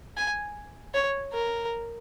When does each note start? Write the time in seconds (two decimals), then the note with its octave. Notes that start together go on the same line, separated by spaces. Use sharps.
0.17 G#5
0.94 C#5
1.33 A#4